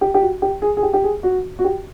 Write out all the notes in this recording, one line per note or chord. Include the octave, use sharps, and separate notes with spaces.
G4
G4
F#4
G4
G#4
G#4
G4
G4
G#4
F#4
F#4
G4